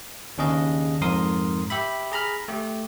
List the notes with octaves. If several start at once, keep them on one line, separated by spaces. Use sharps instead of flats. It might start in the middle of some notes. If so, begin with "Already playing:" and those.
D#2 C#3 D4 G#4 D#5
F2 G#2 A#4 C6 D#6
G4 E5 B5
G#4 A#5 B5 F6
A3 G4